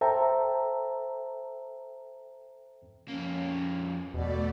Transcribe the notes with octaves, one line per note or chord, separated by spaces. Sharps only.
A4 C5 E5 G5 A5 A#5
F2 A#3 C#4
E2 B2 A3 D5